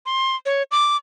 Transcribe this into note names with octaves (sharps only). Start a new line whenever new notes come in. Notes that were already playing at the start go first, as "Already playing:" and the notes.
C6
C#5
D6